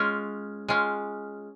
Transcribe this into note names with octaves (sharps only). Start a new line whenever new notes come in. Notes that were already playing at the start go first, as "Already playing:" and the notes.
Already playing: G#3 C#4 F4
G#3 C#4 F4